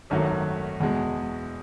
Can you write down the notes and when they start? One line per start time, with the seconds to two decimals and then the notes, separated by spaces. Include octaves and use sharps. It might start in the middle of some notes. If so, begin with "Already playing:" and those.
0.10 G#1 F#2 D#3 F#3 A3
0.80 E2 B2 G#3